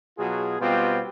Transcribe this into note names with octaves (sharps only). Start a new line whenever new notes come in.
B2 F#3 F4 G#4
B2 G3 B3 C4 F4 G4